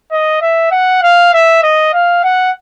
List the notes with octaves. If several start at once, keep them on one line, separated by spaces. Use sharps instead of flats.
D#5
E5
F#5
F5
E5
D#5
F5
F#5